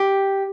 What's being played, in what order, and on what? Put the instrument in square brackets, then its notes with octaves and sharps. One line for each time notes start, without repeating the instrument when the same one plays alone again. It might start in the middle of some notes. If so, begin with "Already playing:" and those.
Already playing: [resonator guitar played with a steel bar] G4